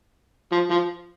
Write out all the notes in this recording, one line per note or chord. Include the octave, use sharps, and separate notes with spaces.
F3
F3